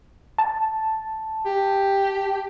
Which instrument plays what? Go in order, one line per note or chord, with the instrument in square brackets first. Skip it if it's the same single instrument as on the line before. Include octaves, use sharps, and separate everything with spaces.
[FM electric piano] A5
[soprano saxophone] G4